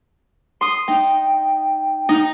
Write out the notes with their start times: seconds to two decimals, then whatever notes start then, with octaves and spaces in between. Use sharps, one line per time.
0.61 C6 D#6
0.88 D#4 G5
2.09 D#4